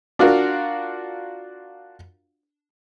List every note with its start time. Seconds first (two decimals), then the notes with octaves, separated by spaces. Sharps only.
0.19 D4 F4 F#4 A#4